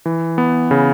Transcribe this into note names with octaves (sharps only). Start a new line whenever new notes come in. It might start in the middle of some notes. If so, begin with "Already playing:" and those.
E3
B3
C#3